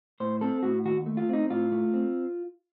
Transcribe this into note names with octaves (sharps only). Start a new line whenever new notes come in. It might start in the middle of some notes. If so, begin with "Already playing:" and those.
A2 C5
C4 A4
A2 F#4
D#2 F#4
A3
F4
C4 D#4
A2 F4
A3
C4